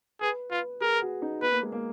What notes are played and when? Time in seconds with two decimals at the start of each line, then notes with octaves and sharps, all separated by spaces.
0.21 G#4 B4
0.51 F4 B4
0.81 G#4 A#4
1.02 F#4
1.22 D#4
1.42 B3 B4
1.51 A#3
1.63 G#3
1.72 A#3